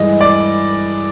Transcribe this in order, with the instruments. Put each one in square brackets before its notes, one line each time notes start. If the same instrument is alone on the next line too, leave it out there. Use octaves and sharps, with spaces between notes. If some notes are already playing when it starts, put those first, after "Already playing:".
Already playing: [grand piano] G2 E3 G#3 D#5
D5